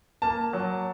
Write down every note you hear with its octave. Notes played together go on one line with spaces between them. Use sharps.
A#3 A5
F#3